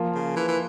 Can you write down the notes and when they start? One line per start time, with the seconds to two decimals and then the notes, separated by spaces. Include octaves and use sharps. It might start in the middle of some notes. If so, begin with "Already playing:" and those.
Already playing: F3 A#3 F4
0.14 C#3
0.36 E3
0.48 E3